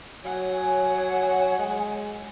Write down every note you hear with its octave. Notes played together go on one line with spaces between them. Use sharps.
F#3 C#5 F#5 G#5
G#3